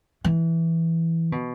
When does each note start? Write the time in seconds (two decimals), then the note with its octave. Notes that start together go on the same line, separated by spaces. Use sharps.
0.24 E3
1.32 B2